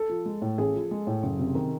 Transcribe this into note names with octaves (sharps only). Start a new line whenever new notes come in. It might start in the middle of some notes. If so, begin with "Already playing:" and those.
Already playing: A4
F3
G#3
A2
A1 G#4
F3
G#3
A2
F#1
C3
D#3